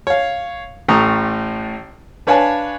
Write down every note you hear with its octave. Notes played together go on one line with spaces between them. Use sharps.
C#5 F5
A1 A2 G5 A#5 C#6 D#6
D4 B4 C#5 F5 G#5 A5